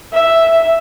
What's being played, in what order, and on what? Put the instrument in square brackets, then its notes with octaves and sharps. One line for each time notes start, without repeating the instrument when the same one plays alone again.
[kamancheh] E5